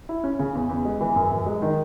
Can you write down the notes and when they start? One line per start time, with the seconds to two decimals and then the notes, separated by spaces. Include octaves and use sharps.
0.09 E4
0.24 C#4
0.39 C#3
0.55 E2
0.69 E2
0.85 G#3
1.01 E3
1.16 F#2
1.31 F#2
1.46 G#3
1.62 D#3